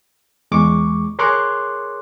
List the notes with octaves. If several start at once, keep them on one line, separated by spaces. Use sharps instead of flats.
E2 G#3 C#6 D6
G#4 A#4 C#5 C6 D6 F#6